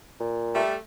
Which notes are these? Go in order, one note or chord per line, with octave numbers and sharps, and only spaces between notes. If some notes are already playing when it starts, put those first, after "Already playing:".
A#2
G3 A3